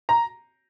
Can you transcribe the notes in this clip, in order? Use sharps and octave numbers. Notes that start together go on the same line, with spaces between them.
A#5